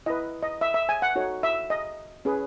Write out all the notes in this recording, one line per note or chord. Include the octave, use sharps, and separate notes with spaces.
E4 B4 D#5
D#5
E5
E5
G#5
F#5
D#4 F#4 A4 C#5
E5
D#5
C#4 G#4 B4